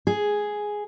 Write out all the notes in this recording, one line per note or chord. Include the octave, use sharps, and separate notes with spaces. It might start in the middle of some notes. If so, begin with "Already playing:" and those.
G#4